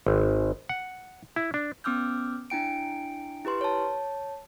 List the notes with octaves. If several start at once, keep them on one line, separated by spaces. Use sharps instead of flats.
G#1
F#5
E4
D4
B3 C#4 D6 E6 F6 G6
D4 E4 G5 D7
E4 G4 B4 C6
C#5 A5